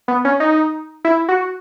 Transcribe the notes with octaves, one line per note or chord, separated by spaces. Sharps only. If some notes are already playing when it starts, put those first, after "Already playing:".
B3
C#4
D#4
E4
F#4